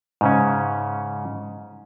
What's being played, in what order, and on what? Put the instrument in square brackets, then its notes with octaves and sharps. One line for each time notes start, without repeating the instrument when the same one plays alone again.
[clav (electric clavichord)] G#2 C#3 C#4